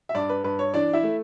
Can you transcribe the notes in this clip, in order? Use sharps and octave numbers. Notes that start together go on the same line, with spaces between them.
E5
G2 D4 D5
B4
G2 B4
C#5
E3 D4 D5
E4 E5
A3